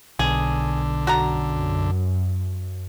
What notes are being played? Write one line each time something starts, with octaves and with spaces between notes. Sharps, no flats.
B1 D3 G#4
F#2 F#4 A4 A#5